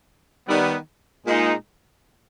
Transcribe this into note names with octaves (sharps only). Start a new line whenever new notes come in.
D#3 G3 B3
A#2 G#3 D#4